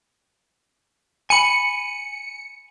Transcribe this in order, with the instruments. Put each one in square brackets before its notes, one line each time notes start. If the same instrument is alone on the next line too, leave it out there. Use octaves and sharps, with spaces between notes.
[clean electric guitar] G#5 B5 [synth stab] C#7